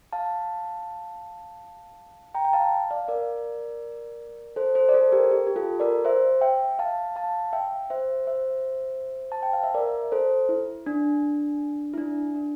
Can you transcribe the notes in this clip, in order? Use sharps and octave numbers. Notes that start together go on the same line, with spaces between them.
F5 A5
G5 A#5
G5
F5 A5
D5 F5
A#4 D5
A4 C5
A4 C5
D5
A4 C5
G4 A#4
G4
G4
F4 A4
A#4 D5
C5 E5
E5 G5
F5 A5
F5 A5
E5 G5
C5 E5
C5 E5
A5
G5
F5
E5
A#4 D5
A4 C5
E4
D4
E4
D4
D4